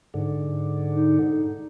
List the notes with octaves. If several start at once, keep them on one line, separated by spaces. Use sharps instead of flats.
G#2 D3
D#4